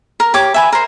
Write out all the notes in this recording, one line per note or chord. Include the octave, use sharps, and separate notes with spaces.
A#4
G4 C#5 D6
E5 G#5 B5
A#4 C5